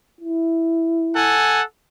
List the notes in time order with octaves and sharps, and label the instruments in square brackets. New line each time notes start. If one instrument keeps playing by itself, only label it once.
[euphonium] E4
[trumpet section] A4 F#5 G#5